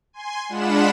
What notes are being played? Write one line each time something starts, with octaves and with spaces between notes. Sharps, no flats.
G#5 C6
G#3 D4 F4 F#5 B5 E7